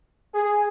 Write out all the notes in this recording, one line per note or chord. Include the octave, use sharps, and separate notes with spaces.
G#4